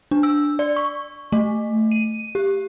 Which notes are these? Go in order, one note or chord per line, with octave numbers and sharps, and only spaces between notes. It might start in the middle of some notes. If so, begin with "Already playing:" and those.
D4
E6
D5
C#6
A3
D#7
G4